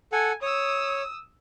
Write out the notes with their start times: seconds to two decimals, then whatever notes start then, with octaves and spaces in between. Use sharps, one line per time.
0.12 A4 F#5 G#5
0.42 C#5 D#6 E6